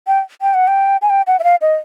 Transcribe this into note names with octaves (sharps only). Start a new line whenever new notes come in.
G5
G5
F#5
G5
G#5
G5
F#5
E5
F5
D#5